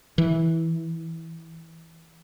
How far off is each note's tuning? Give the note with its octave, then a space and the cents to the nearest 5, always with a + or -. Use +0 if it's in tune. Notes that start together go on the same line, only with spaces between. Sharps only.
E3 -10